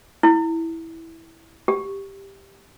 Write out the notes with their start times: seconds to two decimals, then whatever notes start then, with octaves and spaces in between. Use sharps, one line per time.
0.23 E4
1.68 G4